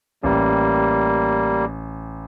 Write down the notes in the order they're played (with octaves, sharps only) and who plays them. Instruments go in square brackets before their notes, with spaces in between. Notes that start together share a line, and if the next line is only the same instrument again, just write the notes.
[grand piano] A1 [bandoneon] G3 A#3